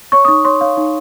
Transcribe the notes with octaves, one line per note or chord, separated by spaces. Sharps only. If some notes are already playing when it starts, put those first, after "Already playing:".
C#5 C#6
D#6
D#4 C#6
C#5 C6
C#5 F5
D#4